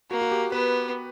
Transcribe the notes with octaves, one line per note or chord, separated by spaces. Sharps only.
A#3 F#4
F#4
G4
B3 B4